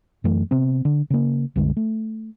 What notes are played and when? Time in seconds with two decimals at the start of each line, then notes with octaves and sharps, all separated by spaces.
0.24 F#2 E3 A3
0.51 C3 B3 C4
0.85 D3
1.10 C#3 A#3
1.56 C2 F#2 D3 G#3
1.77 A3